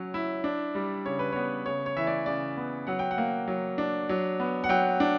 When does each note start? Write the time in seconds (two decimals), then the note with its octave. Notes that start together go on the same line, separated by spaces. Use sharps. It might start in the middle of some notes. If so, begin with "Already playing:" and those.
Already playing: F#3 C#4
0.14 E4
0.44 D4
0.75 G3
1.06 C#3 C#5
1.19 B4
1.32 B3 C#5
1.66 C#3 C#5
1.86 C#5
1.96 E3 E5
2.07 D5
2.26 C#3 D5
2.57 B3
2.87 F#3 F#5
2.99 G5
3.11 F#5
3.18 A#3
3.48 F#3
3.78 D4
4.09 F#3
4.40 B3
4.64 F#5
4.69 F#3 G5
5.00 D4